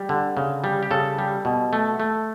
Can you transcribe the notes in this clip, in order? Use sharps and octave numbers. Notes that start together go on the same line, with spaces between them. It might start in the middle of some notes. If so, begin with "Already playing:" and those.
Already playing: G3
D3
C#3
G3
G4
C#3 A4
G3
B2
A3
A3